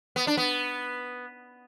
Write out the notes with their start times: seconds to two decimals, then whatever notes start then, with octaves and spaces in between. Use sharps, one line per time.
0.16 B3
0.27 D4
0.37 B3